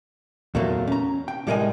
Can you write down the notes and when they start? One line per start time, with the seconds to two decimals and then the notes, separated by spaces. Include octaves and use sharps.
0.55 E2 A#2 F#3 A3 A#3
0.88 C#4 A#5
1.28 G5
1.47 A2 G3 G#3 A#4 D#5 G#5